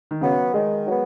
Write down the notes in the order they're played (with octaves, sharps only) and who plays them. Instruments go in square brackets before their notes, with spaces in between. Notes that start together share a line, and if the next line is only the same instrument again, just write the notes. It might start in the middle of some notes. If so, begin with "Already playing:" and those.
[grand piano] D#3
[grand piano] C#3 [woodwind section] F#3 B3
[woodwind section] D#3 [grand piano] G#3
[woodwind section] F#3 B3